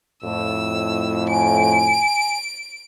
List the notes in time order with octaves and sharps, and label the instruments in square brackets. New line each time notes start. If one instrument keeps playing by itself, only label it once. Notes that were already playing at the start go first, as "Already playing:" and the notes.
[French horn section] F2 A2 [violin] E6
[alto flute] G#5 [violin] D7